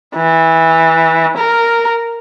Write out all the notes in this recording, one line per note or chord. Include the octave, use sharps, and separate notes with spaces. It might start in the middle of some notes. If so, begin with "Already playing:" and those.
E3
A#4